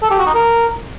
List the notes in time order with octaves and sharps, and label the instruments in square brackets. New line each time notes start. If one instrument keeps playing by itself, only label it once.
[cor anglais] A4
G4
F#4
D#4
A#4